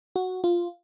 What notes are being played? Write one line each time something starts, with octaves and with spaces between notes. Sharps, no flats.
F#4
F4